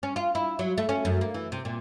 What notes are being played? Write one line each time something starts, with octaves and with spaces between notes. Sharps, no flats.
C#4
F4
E4
F#3
A3
C#4
F#2
A#3
E3
C3
A#2